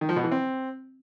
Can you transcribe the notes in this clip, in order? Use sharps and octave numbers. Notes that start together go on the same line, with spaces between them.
D#3
F3
B2
E3
C4